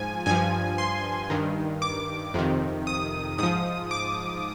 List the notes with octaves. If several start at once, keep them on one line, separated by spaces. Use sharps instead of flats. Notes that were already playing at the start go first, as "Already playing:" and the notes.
Already playing: G#2 F3 G#5
G2 F3 G#5
C6
G2 D#3
D6
F2 C3 D#3
D#6
G#2 F3 D#6
D6